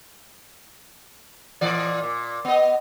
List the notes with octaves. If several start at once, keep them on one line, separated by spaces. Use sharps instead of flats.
A#2 E3 D5
A#2
B3 D#5